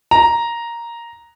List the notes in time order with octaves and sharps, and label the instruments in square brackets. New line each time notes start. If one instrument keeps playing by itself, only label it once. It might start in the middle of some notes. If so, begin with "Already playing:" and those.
[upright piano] A#5